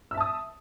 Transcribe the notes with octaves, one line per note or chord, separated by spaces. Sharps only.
E5 A5 D#6 E6